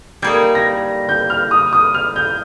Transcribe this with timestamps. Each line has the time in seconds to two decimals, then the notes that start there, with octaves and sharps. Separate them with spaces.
0.22 G3 A#3 D#4 G#6
0.55 A#6
1.09 G6
1.30 F6
1.51 D#6
1.73 D#6
1.94 F6
2.16 G6